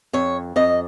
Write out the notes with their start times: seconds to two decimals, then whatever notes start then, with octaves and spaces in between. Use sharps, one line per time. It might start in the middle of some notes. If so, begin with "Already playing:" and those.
0.13 F2 C#5
0.56 F2 D#5